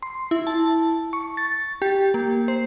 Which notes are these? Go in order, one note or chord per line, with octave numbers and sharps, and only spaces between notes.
C6
E4
A5
C#6
A6
G4
A#3
C5